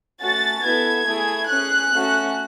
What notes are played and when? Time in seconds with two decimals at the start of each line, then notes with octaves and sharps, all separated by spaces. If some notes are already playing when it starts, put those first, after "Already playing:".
0.21 A3 C#4 F#4 A6
0.64 B3 E4 A4 G#6
1.07 A3 E4 G#4
1.50 C#4 G#4 F#6
1.92 A3 C#4 F#4